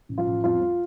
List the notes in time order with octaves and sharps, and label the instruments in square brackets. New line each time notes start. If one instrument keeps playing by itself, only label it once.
[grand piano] A1
F3 F4
A1
F2 F3 F4
F3